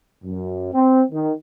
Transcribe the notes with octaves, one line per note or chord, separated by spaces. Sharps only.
F#2
C4
D#3